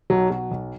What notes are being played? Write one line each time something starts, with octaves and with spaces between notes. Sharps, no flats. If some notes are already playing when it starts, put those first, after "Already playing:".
B1 F#3
B2 F#3
B1